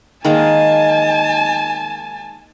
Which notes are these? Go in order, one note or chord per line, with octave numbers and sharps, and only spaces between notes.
D#3 G#3 A#3 G#5 A5